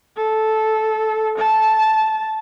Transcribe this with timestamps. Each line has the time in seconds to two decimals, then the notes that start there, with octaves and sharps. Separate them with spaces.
0.17 A4
1.38 A5